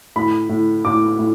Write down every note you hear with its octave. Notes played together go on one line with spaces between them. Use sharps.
A2 B5
A2
A2 D6
A2